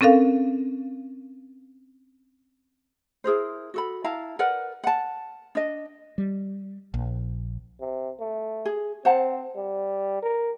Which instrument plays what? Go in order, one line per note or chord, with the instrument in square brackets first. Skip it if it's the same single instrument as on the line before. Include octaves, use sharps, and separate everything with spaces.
[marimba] C4 C#4 A4 A#4 F5
[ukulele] E4 G#4 A#4 C5
F#4 A4 B5
E4 F5 A5 A#5
A#4 B4 D5 F#5
F#5 A5
D4 D#5
[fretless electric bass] G3
A#1
[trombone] C3
A3
[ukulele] G#4
[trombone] C4 [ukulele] C5 F#5 A5
[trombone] G3
A#4